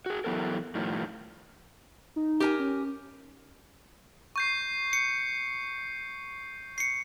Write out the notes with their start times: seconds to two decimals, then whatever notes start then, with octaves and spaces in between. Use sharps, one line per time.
0.06 F#4 G#4
0.24 E3 F#3 B3 G4 A4 A#4
0.75 A2 D#3 F3 G3
2.16 D#4
2.40 G4 A#4 G#5
2.59 C#4
4.36 C#6 G6 C7
4.93 C#7
6.78 C7 C#7